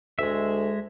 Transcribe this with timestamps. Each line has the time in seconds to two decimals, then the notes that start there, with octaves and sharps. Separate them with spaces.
0.19 D2 G#3 E5